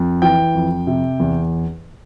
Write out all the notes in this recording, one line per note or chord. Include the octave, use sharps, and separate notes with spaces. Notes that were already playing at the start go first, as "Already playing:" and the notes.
Already playing: F2
E3 G5
F2
C3
E2